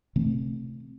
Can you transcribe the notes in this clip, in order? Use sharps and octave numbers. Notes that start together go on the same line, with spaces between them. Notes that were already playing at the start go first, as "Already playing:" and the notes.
C3 E3 A3 C4